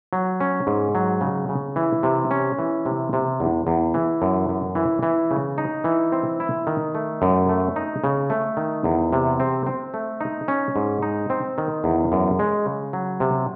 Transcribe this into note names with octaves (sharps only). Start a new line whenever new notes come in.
F#3
C#4
G#2
F#3
C#3
C#3
E3
C3
C#4
E3
C3
C3
E2
E2
E3
F#2
F#2
E3
E3
C#3
D#4
E3
C4
E4
D#3
A3
F#2
A3
D#4
C#3
A3
D#3
E2
C3
C4
C4
A3
D#4
C#4
G#2
D#4
C4
D#3
E2
F#2
G#3
C#3
F#3
C3